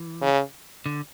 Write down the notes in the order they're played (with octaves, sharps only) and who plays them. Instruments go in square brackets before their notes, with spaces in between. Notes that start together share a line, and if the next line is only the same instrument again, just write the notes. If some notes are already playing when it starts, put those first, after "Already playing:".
Already playing: [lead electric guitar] E3
[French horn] C#3
[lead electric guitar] D3